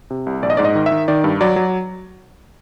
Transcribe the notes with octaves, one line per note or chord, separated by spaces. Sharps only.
C3
C2
A#1 D5
D#5
G#2 D5
D#5
D#3
E5
D#3
D#3 D5
G2
F#3 D5
F#3